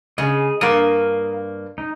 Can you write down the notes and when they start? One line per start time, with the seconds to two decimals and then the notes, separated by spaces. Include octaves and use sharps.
0.18 C#3 G#4 D#5
0.61 G2 A#3 F5 A#5 D#6
1.78 D#4